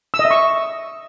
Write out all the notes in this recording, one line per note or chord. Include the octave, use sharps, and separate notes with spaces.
E6
D#5
E5
C#6